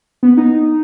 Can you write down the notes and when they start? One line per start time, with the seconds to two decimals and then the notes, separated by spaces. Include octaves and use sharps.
0.23 B3
0.37 D#4